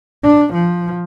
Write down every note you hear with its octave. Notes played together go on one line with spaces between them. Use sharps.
D4
F3